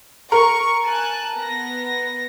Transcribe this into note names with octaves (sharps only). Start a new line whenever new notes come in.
A#4 C#6
G#5 A5 F#6
B3 A#6